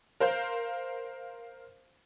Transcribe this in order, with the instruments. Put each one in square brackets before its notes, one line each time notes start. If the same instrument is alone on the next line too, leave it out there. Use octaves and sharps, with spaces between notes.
[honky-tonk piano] A#4 C5 F5 G6